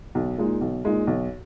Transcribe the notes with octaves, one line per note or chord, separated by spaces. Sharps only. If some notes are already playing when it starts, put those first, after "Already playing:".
B1
A#2 G#3 D#4
B1
A#2 G#3 D#4
B1